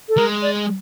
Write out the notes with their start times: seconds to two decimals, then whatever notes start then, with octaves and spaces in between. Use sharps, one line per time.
0.09 A4
0.17 G#3 A#4
0.42 D5